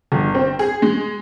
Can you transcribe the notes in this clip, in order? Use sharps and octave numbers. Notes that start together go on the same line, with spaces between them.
G1
C4
G#4
G#3